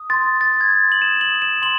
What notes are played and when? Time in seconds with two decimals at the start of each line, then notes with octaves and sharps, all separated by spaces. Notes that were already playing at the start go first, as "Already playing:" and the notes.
Already playing: D#6
0.10 C6 A6
0.41 C6 A6
0.61 G#6
0.71 C6
0.92 F#7
1.02 D#6 E7
1.21 F#7
1.32 D#6
1.42 E7
1.62 C6 F#7